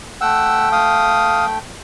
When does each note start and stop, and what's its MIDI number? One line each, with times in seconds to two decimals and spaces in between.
0.21 1.58 57
0.21 0.69 78
0.21 1.58 79
0.21 0.69 88
0.72 1.45 77
0.72 1.45 87